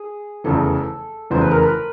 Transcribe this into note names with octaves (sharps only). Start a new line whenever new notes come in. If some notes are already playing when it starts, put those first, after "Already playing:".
Already playing: G#4
F1 E2 C#3 E3 A4
F1 E2 C#3 E3 C5
B4
A#4
B4